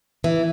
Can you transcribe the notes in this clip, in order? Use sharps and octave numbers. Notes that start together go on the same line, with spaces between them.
E3